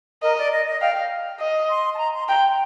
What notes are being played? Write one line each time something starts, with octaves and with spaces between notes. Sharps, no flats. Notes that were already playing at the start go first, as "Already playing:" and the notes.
A#4 D#5
D5
D#5
D#5
F5 G5
D#5
C6
A5
A#5
C6
G5 A#5
G5